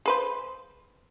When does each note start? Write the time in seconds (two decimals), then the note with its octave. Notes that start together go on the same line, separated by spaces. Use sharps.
0.06 G#4 B4 C5